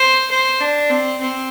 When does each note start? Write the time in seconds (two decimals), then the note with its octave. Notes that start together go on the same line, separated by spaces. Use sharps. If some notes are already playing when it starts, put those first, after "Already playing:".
Already playing: C5
0.31 C5
0.60 D4
0.90 C4
1.21 C4